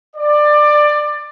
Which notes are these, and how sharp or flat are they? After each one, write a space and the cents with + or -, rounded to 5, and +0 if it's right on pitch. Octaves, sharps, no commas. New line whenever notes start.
D5 +20